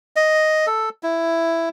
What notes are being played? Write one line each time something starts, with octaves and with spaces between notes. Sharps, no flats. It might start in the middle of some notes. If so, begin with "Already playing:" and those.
D#5
A4
E4